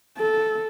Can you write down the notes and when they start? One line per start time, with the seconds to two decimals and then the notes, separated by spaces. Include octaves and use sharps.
0.18 A4